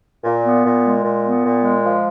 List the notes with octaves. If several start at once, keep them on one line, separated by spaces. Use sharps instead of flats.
A#2
B3
A#2
G#3
A#2
B3
A#2
G#3
F3